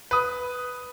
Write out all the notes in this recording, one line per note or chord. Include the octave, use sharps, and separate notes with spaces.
B4 D#6